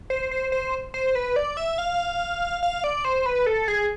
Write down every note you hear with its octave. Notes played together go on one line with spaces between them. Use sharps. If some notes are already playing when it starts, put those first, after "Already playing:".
C5
C5
C5
C5
B4
D5
E5
F5
F5
D5
C5
B4
A4
G#4